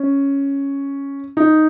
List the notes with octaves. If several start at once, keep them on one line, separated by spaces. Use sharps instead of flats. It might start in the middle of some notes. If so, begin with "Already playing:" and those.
Already playing: C#4
D#4